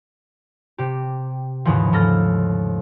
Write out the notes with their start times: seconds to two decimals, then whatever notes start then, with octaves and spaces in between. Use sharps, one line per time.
0.78 C3 G4
1.65 D#2 G#2 C#3 E3 F3
1.93 G#2 A3 A4 F6 A#6